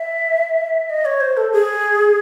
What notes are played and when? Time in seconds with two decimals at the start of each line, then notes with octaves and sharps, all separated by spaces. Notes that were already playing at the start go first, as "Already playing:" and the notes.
Already playing: E5
0.90 D#5
1.05 C#5
1.21 C5
1.37 A4
1.52 G#4